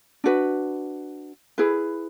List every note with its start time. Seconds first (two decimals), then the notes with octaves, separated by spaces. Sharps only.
0.24 D4 F#4 B4
1.58 E4 G#4 B4